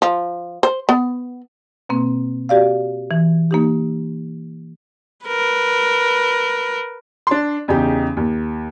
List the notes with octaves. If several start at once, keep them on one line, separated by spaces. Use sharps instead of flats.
F3
C5
B3
B2 A#3 C4
F#4 G4 D5 F5
E3
A#3 D#4 G4
A#4 B4
D4 C6
E2 C#3 D#4 G4
D#2